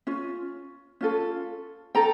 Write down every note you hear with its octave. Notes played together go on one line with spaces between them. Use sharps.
C#4 F4
C#4 F4 A4
D4 A4 G5 A#5